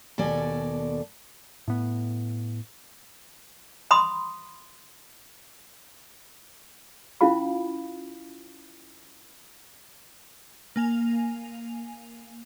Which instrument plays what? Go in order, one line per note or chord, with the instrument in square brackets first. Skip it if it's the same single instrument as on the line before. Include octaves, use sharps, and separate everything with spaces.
[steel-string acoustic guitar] D#2 B2 A4 D5 G#5
[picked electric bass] A2 B3
[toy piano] B5 C6 D#6
C#4 E4 F4 F5 B5
[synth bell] A#3 G#5 F7